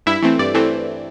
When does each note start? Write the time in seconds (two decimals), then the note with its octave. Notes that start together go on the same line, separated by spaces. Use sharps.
0.06 G2 E4 E5
0.22 E3 A3 C4
0.39 G2 D5
0.54 E3 A3 C4